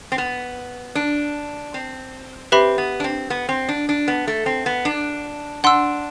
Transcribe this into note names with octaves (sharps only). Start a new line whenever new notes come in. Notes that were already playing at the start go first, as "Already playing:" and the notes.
C4
B3
D4
C4
C4 G4 B4 E5 B5
B3
D4
C4
B3
C4
D4
D4
B3
A3
C4
B3
D4
D4 F#5 C6 E6